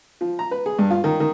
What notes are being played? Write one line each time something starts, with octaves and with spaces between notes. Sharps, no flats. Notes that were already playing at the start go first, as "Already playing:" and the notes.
F3
A#5
B4
G#4
G2
F4
D#3
D#3